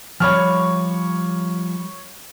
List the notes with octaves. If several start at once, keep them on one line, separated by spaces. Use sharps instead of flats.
F3 G3 C#5 B5 C#6 F6